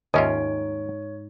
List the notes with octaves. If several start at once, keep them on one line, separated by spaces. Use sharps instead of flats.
D#2 G#2 C#4 F4 C#5 D#5 E5